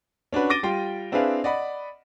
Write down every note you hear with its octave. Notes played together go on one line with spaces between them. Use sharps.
C#4 D4 F#4 B4
D6 A6 A#6 D7 D#7 G7
G3 F4 G5 C6
C4 D4 E4 G#4 B4 F5
D5 D#5 F#5 B5